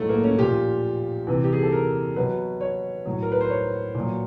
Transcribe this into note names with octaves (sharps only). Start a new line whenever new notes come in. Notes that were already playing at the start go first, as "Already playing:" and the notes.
Already playing: A2 F#3 G#3 A3
A#3
C#4
A#2 F3 G4
C3 E3
G4
G#4
A4
A#4
B2 F#3 B4
C#5
A2 F#3
A#4
B4
C5
C#5
A#2
F#3